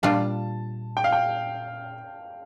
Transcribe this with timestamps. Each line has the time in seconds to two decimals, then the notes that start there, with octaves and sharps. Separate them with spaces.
0.03 A#2 G3 D4 F4 A5
0.97 G5
1.04 F5
1.12 G5